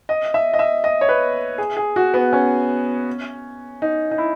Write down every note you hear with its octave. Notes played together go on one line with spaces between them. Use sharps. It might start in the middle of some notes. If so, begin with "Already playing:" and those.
D#5
E5
D#5
E5
D#5
C#5
B4
G#4
G#4
F#4
B3
C#4
D#4
D#4
E4